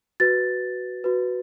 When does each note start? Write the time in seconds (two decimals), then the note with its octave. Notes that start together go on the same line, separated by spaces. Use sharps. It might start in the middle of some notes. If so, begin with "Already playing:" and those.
0.20 F#4 B4 A6
1.04 F#4 B4